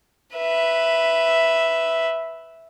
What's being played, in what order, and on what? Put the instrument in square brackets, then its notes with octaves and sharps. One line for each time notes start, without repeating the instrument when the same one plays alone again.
[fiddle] B4 E5